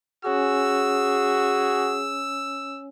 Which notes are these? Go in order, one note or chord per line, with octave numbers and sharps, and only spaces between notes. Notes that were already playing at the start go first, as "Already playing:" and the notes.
C#4 F#4 G#4 C#5 G#5 E6